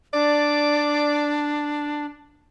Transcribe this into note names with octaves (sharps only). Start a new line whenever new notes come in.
D4 D5